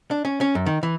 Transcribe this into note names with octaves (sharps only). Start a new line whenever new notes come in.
D4
C#4
C#4
F#2
D#3
E3